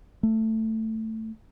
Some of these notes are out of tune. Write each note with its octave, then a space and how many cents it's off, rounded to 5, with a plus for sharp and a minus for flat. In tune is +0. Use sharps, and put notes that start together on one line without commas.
A3 +10